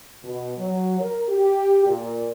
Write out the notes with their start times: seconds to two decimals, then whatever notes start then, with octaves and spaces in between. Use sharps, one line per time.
0.24 B2
0.58 F#3
1.00 A#4
1.29 G4
1.86 A#2